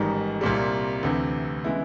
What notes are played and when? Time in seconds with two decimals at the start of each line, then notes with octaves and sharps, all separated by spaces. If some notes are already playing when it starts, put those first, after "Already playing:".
Already playing: A1 G#2 D#3 G3
0.41 C2 A#2 G3
1.03 D2 C3 E3
1.64 C#3 E3 G#3 B3 E4